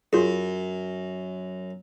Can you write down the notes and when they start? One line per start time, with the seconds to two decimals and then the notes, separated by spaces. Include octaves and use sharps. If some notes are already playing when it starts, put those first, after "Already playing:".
0.13 F#2 F4 G#4